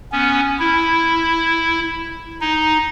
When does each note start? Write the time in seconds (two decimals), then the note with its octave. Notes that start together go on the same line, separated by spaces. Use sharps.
0.12 B3 C#4
0.59 E4
2.41 D#4